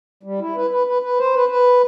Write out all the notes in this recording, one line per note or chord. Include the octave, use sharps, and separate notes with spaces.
G3
E4
B4
B4
B4
B4
C5
B4
B4